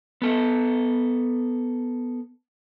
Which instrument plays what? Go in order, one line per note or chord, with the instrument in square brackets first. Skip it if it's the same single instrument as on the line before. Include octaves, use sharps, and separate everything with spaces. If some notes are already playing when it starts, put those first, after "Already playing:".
[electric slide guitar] B3 A4